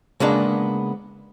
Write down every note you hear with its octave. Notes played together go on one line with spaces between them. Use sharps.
C#3 G#3 A#3 B3 D4